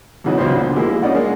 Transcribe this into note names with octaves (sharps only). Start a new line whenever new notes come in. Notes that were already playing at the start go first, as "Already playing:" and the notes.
E2 C#3 E3 F#3 D#4
C#2 F#3 B3 F4 C5
A#2 D3
F3 G#3 A#3 E4 G4
C#4 D#4 D5 F#5
G#3 A#3